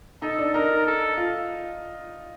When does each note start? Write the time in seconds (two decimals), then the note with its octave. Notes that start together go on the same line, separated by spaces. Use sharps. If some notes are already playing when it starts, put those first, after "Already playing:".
0.22 D#4 A4
0.39 D4
0.54 D#4 A#4
0.87 A4
1.17 F4